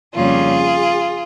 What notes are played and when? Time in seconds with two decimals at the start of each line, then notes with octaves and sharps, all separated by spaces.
0.14 F2 C#3 G3 A#3 C#4 F4 G#4